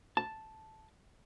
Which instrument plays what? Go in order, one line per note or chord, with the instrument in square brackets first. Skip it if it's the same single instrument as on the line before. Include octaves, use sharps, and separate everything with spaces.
[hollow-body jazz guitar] A5